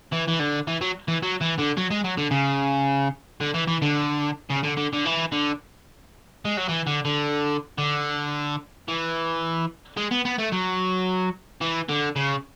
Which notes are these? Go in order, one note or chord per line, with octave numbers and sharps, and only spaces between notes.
E3
E3
D3
E3
F#3
E3
F#3
E3
D3
F#3
G#3
F#3
D3
C#3
D3
E3
E3
D3
C#3
D3
D3
D3
E3
D3
G#3
F#3
E3
D3
D3
D3
E3
G#3
B3
B3
A3
F#3
E3
D3
C#3